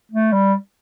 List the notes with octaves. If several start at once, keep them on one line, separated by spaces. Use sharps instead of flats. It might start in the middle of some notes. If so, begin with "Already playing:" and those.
A3
G3